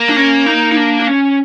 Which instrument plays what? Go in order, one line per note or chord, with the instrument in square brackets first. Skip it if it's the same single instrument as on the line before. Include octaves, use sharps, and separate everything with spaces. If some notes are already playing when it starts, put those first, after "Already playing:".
Already playing: [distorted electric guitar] A#3
[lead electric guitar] D4
C#4
D#4
D#4
D4
D4
C#4